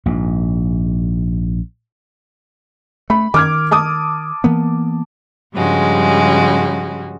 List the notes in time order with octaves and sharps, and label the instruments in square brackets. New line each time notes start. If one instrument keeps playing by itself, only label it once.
[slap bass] A#1 G#2
[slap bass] A3 [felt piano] B5
[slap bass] D#3 [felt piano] D6 F6 G#6
[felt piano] A5 D6 D#6
[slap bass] E3 A#3 B3
[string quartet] G2 C#3 F3 G3 G#3 F#4